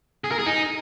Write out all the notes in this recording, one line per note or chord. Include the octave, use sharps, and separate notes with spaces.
G#4
A#4
G#4
D#4